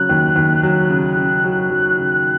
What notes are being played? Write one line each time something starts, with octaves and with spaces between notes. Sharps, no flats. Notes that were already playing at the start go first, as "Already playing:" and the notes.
Already playing: C#3 F#3 C#4 F#6
D#2
D#2
F#3
C#3 F#6
C#3
F#3
F#3
C#3